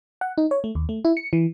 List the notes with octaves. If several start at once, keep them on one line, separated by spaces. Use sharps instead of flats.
F#5
D#4
C#5
A3
D#2
A3
E4
C#7
E3